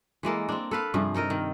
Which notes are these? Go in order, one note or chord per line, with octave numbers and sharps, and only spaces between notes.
E3 G#3 A#3 A4
C4 D4
A4 B4 F5
G2 C3 F3 G#4
D#4 A4 A#4 D#5
D#3